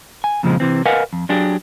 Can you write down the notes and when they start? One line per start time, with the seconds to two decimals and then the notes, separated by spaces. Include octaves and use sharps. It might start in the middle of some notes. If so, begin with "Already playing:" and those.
0.24 G#5
0.43 F2 A#2 C#3 F3 G#3 C4
0.60 C3 E3 C4
0.85 A#4 B4 D#5 F5 F#5 G#5
1.13 F2
1.29 F#3 D4 G4 G#4